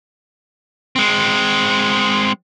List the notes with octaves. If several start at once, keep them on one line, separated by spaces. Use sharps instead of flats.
G#3 C4